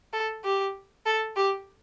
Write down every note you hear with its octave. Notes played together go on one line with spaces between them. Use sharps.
A4
G4
A4
G4